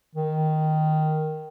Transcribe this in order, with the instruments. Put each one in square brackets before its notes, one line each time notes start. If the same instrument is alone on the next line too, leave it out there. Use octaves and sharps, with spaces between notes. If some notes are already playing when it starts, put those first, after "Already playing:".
[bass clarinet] D#3